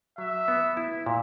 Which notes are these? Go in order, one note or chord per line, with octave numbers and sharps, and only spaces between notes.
F#3 E5
B3
E4
A#2